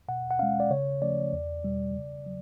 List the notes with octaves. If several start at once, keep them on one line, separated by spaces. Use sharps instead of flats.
B2 F#5
F#5
G#3 C#4 F5
D5
C#3 C#5
F3 A3 C#4 D5
E2
B2 G3
C#3
F#3